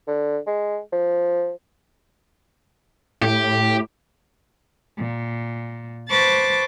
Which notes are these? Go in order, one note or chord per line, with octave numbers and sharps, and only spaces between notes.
D3
G#3
F3
A2 G4
A#2
B4 C5 A5 C#6 D6 A6